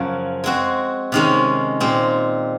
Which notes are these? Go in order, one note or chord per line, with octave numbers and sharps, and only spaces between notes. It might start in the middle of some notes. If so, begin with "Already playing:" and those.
Already playing: F#2 C#3 F3
G#3 C4 F#4
C3 D#3 G#3 C#4
A#2 G#3 C4